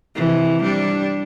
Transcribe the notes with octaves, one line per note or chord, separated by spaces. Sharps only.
C3 E3
G3 D4